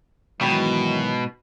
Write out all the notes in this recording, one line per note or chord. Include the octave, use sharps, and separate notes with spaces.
G#2 B2 D#3 E3 F#3 G5 B5